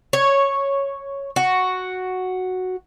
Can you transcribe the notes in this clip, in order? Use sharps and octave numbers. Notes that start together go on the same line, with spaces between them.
C#5
F#4